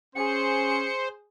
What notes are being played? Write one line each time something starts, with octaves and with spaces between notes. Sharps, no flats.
C#4 G#4 C5 C#7